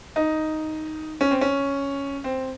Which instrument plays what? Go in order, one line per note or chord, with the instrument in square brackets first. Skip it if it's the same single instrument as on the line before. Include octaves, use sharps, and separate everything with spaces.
[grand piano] D#4
C#4
C4
C#4
C4